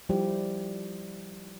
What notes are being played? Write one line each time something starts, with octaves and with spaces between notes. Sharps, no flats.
F3 G3 E4 G4